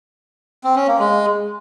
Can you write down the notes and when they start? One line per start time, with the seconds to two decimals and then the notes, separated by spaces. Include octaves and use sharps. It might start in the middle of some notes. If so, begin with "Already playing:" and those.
0.64 C4
0.76 C#4
0.87 A#3
0.99 G#3